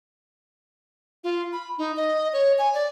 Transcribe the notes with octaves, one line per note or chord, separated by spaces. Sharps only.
F4
B5
D#4
D#5
C#5
G#5
D5